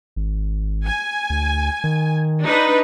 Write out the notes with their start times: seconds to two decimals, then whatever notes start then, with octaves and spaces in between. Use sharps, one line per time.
0.16 G#1
0.86 G#5
1.30 D2
1.84 D#3
2.45 D4 D#4 B4